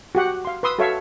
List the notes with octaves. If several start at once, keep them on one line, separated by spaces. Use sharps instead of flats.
F#4 G4 F#5
F5 C6
B4 C6 D#6 E6
F#4 A4 C#5 E5 F5 C#6